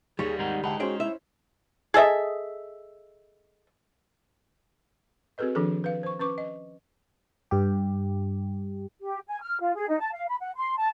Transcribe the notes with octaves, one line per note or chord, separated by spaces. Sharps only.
D#2 G3 G#4 C#5
D#3 G#3 D#4 F#5
D2 G#3 D#4 G4 F#5 A5 B5
C#4 F#4 G#4 C5 D#5 G5
E4 E5
G#4 A4 D#5 E5
C4 F#4 G#4 A4 B4 D#5
D#3 F3 D4 G#4 A4
B4 F5
C5 C#6
C#4 B4 C#6 D6
D#5
G2 G4
G4
G#5
F6
F4
G#4
D#4
A5
F5
B5
F#5
C6
A5